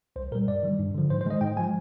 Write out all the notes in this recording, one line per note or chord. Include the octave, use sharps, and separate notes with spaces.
C2 C5
A#2 G3 A#4
G2 D5
D#3 G3
G2
D3 F3
G#2 C5
C5
D#3 G#3 D#5
G#2 G5
F3 G#3 G#5